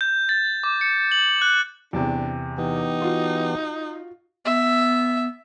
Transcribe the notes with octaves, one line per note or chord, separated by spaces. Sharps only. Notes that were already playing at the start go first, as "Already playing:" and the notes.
G6
A6
D6
C#7
F#7
F#6
E2 C3 D4
E3 B3 D#4 G4
F4 F#4
B3 E5